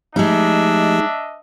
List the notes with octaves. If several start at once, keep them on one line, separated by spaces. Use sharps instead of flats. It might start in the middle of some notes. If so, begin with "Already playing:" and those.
F3 G#3 A3 D4 D#4 G4 D#5 E5